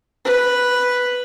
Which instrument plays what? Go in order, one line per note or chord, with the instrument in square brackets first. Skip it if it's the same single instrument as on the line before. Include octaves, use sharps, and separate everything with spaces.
[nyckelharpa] B4